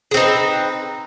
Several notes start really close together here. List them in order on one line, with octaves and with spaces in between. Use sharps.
G#4 C4 D#4 B4